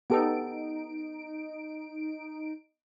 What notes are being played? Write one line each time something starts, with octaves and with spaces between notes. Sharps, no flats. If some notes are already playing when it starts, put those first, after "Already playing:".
B3 D#4 G4 A4 D7